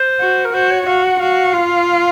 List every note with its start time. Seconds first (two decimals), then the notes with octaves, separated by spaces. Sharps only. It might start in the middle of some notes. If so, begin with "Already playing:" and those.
Already playing: C5
0.20 F#4
0.45 A#4
0.53 F#4 C5
0.70 C#5
0.86 F#4 F5
1.03 F#5
1.19 F#4 F5
1.53 F4